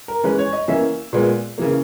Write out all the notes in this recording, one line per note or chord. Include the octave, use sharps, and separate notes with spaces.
A#4
E3 G#3 C#4 B4
C#5
D#5
E3 A#3 C#4 E5
A#2 G#3 B3
C#3 E3 A#3